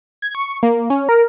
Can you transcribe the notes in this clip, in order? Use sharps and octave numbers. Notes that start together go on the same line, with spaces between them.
G#6
C#6
A#3
C#4
A#4